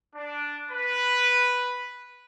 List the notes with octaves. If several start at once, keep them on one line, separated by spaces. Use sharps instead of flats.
D4
B4